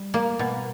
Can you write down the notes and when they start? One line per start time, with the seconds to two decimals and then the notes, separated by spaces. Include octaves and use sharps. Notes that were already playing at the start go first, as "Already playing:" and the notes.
Already playing: G3
0.14 A#3
0.39 B2